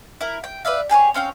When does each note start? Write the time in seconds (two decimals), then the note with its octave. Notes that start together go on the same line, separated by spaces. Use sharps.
0.21 E4 A#4
0.44 G5
0.65 B4 D5 E5 F5
0.89 G4 G#4 A#4 C#5
1.14 C4 C#4 F5 G5